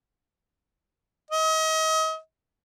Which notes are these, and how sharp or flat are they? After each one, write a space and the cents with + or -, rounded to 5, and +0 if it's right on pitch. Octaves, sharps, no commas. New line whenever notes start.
D#5 +35